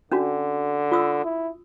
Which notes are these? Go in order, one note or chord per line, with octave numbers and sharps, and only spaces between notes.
D3 C#4 D4 F#4
F4 D#6 E6
E4